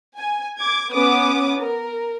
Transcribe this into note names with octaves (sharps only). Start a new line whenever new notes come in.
G#5
D6 G#6
B3 C#4 D6 D#6
A#4